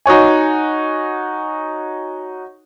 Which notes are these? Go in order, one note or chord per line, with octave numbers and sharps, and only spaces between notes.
D#4 F#4 C#5 G#5